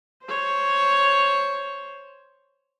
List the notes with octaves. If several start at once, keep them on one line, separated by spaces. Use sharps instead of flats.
C5 C#5